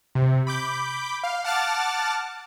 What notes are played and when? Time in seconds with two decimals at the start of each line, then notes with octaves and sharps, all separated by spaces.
0.15 C3
0.47 B5 D6 G6
1.23 F5
1.44 F#5 A5 D6 F6 A6